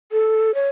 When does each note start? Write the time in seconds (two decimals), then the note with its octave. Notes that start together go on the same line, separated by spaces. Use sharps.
0.12 A4
0.55 C#5